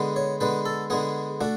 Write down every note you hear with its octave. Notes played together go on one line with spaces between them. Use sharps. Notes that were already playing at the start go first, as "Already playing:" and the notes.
Already playing: D3 G#3 B3
C#5
D3 G#3 B3 B4
A4
D3 G#3 B3 G#4
A3 D4 F#4